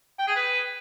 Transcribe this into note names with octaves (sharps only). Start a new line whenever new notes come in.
G5
G#4
B4